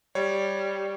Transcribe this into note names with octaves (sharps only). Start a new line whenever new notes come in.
G3 C#5